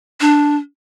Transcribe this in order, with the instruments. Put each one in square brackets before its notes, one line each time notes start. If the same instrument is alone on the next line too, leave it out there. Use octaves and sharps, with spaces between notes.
[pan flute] D4